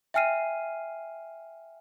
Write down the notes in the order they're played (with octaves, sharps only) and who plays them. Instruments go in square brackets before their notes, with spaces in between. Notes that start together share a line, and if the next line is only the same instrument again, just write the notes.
[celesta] E5 G5 G#5 F6 C7 D#7